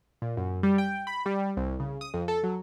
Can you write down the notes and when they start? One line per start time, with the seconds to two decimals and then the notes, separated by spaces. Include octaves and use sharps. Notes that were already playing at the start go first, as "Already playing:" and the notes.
0.22 A#2
0.37 F#2
0.63 G3
0.78 G5
1.07 B5
1.26 G3
1.57 C2
1.80 C#3
2.01 D#6
2.14 F2
2.28 A4
2.43 F#3